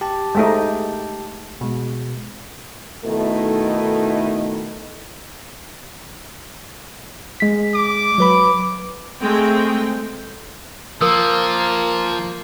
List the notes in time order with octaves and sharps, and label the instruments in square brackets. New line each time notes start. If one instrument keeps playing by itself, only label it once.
[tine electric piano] G4 A5
[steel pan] G#3 A3 D#4
[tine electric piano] B2 G#3
[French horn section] B2 D#3 A3 D#4 E4 A4
[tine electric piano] G#3 B6
[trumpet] D6
[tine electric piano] F#3 B4 B5
[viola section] G#3 A3 C4 G5
[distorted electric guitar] F3 [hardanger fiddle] A#3 [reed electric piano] A#4 D#6 E6